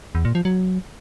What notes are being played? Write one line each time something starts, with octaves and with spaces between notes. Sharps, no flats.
E2
A#2
F3
F#3